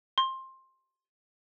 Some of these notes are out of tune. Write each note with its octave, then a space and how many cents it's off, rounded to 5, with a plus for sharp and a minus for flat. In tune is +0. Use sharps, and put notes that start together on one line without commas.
C6 +15